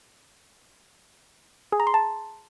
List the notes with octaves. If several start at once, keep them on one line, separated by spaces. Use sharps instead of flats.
G#4
A#5
C6
A5